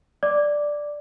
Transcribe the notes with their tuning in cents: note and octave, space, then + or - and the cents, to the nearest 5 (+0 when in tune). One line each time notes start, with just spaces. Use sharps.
D5 +0 D6 +0